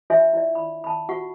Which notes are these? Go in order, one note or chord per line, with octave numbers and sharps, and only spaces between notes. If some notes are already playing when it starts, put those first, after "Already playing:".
D4 F4 C#5 E5 G#5 C6
E4 D5
B5
A5 B5
F4 F#4 F#5 C#6